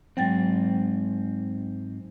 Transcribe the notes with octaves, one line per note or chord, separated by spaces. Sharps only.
G#2 F#3 C4 G5 A6